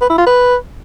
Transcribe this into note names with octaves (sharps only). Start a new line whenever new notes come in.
B4
E4
F4
B4